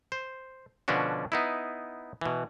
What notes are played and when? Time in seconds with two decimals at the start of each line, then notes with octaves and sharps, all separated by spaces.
0.12 C5
0.88 B2 D3 F3 C#4 D4 F#4
1.32 B3 D#4 E4
2.21 B2 E3